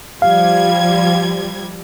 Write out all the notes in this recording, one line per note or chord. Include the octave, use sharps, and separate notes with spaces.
F3 G3 F5 G#6